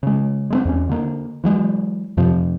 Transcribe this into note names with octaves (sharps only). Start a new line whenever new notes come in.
C#3 G#3
G#3 A3 C4
E2 C#4
D3 A#3
E3 F#3 G#3
F2 C3 F3